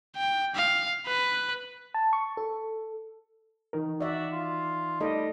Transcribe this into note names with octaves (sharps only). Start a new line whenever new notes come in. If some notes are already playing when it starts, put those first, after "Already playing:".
G5
F5
B4
A5
C#6
A4
E3 D#4 A#4
F#4 D5 E5
F4
G3 A3 D#4 A4 D#5